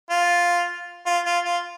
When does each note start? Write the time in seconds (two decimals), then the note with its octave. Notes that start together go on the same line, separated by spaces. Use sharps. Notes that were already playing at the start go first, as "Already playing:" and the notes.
0.10 F4
1.06 F4
1.25 F4
1.44 F4